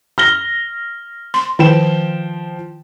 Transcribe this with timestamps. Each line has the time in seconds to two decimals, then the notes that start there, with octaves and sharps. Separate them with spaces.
0.18 F6 A#6 G7
1.34 C6
1.59 D#3 F3 G5 E7